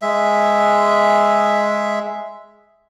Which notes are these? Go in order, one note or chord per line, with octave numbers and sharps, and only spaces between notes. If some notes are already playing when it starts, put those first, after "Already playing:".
G#3 E5